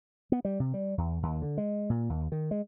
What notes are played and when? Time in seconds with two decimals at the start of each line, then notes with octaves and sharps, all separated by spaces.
0.32 B3
0.45 G3
0.60 C3
0.74 G3
0.98 E2
1.23 D#2
1.42 D3
1.58 G#3
1.90 A#2
2.09 D#2
2.32 D#3
2.51 G#3